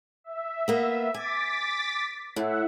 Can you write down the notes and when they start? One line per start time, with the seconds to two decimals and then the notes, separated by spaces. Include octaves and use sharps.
0.24 E5
0.68 A#3 B3
1.14 G#5 D6 A6 B6
2.36 A2 E5 F#5